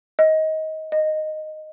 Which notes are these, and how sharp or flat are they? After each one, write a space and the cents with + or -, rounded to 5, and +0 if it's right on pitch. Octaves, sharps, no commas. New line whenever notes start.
D#5 +20
D#5 -5